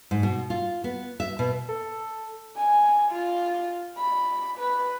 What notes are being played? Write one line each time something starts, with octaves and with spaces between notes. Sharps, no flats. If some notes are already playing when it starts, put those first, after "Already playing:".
G#2
B2
F4
B3
E5
B2
A4
G#5
F4
B5
B4